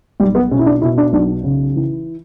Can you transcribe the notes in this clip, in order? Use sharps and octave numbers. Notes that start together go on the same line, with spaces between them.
B1 G3
B3
B2 C#4
E4
D4
B2 E4
D4
B1 D4
C#3
E3